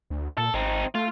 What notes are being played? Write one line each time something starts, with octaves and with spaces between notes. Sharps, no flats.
D2
A#2 A4
G#1 C4 D#4
A3 F4